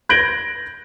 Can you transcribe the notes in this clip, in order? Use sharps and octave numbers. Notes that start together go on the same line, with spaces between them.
G6 G#6 A#6 D7 F#7 G7